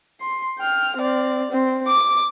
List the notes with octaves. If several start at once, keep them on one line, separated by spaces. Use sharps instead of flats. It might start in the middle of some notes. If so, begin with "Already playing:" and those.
C6
G5 F6
C4 D5
C4
D6